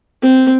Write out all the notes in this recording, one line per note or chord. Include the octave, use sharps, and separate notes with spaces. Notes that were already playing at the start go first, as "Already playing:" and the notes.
C4